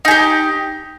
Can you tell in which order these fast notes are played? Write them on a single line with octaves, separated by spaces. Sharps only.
D#4 G#4 G4